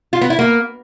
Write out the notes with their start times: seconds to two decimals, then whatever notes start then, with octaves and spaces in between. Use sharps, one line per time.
0.13 F4
0.21 B3
0.30 E4
0.39 A#3